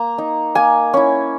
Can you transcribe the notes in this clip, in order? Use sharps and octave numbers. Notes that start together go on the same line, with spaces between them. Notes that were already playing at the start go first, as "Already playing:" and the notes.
Already playing: A#3 A#5
D#4
A#3 G#5
C#4 E4